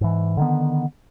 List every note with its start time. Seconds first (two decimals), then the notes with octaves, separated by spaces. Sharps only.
0.01 G#2 E3
0.37 D3 D#3 B3